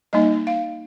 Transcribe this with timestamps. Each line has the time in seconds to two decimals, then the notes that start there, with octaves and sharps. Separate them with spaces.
0.13 G3 A#3 D#4 D#5
0.47 F5